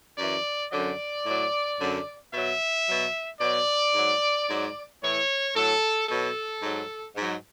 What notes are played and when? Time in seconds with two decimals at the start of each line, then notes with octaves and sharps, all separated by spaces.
0.17 F#2 E3 D5
0.71 F#2 D3 F#3 D5
1.25 A2 F#3
1.79 F#2 D3 F#3
2.32 B2 F#3 E5
2.86 B2 F#3
3.39 B2 F#3 D5
3.93 G#2 F#3
4.48 G#2 F#3
5.01 A2 E3 C#5
5.54 A2 F#3 A4
6.08 B2 F#3 A4
6.61 G#2 F#3
7.15 G#2 F#3